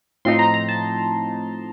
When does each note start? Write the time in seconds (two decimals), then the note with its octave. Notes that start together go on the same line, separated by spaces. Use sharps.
0.25 A2 F3 C4 D#4 C6
0.39 A#5
0.54 A#5
0.69 A5